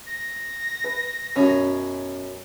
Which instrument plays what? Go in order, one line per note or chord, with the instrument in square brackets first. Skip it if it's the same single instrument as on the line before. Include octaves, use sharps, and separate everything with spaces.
[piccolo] A#6
[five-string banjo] B4
[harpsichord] F#2 B2 [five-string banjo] C#4